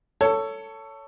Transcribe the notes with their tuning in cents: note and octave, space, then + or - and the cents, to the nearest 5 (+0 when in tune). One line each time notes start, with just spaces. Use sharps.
A4 +15 C#5 +15